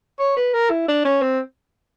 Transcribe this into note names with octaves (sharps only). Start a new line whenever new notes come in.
C#5
B4
A#4
E4
D4
C#4
C4